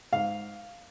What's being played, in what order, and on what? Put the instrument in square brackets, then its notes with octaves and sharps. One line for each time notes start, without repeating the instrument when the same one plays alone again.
[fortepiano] G#2 F5